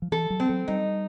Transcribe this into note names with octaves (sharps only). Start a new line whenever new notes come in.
F3
E3 A4
F#3
C4
F#3
G3 D#4